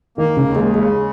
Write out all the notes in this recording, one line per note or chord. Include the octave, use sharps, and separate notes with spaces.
D#3 A#3
C#3
D#2
G#3
C#3 G#3